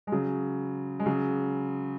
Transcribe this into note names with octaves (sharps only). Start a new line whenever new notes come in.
G#3
C#3 F#3
G#3
C#3 F#3